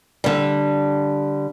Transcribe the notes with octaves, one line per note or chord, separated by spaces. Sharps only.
D3 G3